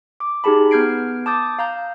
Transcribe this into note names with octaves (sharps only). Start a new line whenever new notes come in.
D6
D#4 G4 G#4 A5 B5
B3 F6 G6 G#6 C7 D7
A5 D6 D#6 G6 A6
F5 A#5 G6